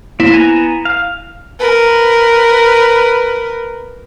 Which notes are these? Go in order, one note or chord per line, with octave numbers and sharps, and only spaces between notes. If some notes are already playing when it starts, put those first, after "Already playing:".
A#3 C4 E4
B3 G#5 A#5
F5
A#4 B4